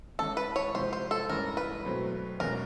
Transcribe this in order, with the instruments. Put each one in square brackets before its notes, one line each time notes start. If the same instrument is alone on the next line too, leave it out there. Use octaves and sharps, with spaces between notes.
[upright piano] E3 G#3 C#4 E4 [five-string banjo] A4
[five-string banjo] B4
C#5
[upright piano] C3 F3 G#3 C4 [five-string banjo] C5
[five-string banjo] C5
A4
[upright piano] G2 E3 G#3 C#4 [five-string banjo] A#4
[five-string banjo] B4
[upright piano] B2 F#3 A3 C4
[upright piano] E2 B2 G#3 C#4 [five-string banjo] A#4